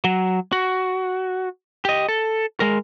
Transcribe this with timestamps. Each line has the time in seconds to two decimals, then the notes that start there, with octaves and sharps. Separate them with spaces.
0.04 F#3
0.52 F#4
1.85 G4 D#5
2.09 A4
2.60 G#3 A#4